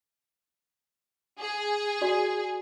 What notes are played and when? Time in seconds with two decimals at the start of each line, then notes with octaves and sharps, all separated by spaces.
1.40 G#4
2.01 F#4 D5 C6